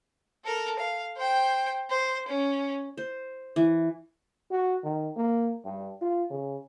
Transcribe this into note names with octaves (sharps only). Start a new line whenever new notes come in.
A4 A#4
F5
C5 G5
C5
C#4
C5
E3
F#4
D#3
A#3
G2
F4
C#3